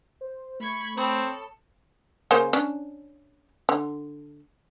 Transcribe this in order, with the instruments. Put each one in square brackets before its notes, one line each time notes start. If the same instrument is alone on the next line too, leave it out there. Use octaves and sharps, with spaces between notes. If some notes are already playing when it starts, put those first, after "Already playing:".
[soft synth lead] C5
[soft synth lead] A3 [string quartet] B5 C#6 G#6
[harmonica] C4 [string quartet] A4 [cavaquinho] C#5 B5 D#6
[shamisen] C#3 A#3 C5
C#4 D4
D3